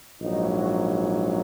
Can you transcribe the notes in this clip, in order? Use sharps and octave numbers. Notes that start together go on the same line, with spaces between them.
A#1 G#2 F#3 D#4
F#4